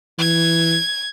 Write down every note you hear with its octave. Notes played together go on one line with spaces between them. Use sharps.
E3 G#6